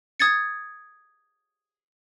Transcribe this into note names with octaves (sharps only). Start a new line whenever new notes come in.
D#6 G#6 A6 C#7